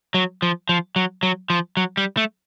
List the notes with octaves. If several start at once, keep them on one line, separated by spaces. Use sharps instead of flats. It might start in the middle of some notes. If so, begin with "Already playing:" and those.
F#3
F3
F3
F#3
F#3
F3
F#3
G3
A3